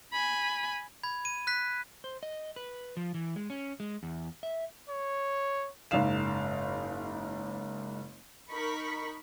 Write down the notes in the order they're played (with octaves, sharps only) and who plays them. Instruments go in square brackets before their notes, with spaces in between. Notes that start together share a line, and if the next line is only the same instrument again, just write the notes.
[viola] G#5 B5
[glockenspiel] B5 G#6
D#7
F#6 B6
[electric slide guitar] C5
D#5
B4
F3
E3
G#3
C#4
G#3
E2
E5
[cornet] C#5
[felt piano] F#1 G#2 D#4 F5 E7
[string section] D#4 A#4 B5 C#6 B6